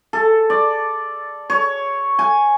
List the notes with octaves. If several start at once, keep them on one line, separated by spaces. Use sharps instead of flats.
A4
D5
C#5
G#5